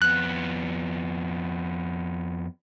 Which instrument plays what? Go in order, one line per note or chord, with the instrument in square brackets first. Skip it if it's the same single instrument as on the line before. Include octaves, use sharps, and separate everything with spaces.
[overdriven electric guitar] F2 B3 [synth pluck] F#6